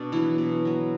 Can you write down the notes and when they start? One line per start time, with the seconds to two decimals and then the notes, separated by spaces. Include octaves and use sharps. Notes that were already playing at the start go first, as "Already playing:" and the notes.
Already playing: B2 D4
0.12 E3 F#3 B3 E4
0.38 B2
0.65 F#3 B3